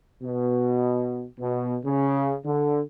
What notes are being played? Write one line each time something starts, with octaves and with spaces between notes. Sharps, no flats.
B2
B2
C#3
D3